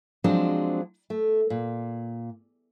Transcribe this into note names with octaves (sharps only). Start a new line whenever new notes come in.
F3 F#3 G#3 C4 D4
A3
A#2